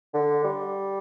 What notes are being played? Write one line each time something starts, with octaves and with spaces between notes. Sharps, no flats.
D3
G3